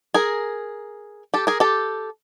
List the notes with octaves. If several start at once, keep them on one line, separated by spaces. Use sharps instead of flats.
G#4 A#4
G4 A4
G#4 A#4
G4 A4